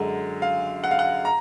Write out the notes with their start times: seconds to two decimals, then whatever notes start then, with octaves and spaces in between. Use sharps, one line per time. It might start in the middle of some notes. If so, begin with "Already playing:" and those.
Already playing: F#2 D3 G#3
0.42 F5
0.84 F#5
0.91 F5
0.99 F#5
1.25 A#5